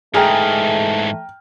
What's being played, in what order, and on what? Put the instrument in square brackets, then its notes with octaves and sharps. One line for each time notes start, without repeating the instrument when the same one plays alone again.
[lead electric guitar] G#2 E3 [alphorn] A3 [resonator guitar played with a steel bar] G#4 [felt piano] G5 A#5 F6